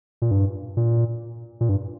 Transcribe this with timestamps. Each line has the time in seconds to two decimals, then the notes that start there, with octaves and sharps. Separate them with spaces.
0.22 A#2
0.31 G2
0.77 A#2
1.61 A#2
1.69 G2